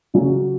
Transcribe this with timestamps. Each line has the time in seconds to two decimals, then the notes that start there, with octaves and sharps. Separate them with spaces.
0.14 C#3 F#3 C#4